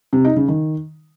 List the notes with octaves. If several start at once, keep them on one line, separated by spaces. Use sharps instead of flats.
C3
D#4
C#3
D#3